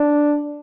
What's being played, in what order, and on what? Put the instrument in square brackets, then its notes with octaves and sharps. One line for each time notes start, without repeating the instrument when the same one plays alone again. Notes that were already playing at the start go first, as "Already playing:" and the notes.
Already playing: [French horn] D4